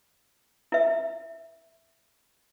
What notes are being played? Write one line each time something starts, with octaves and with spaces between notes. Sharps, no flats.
E4 E5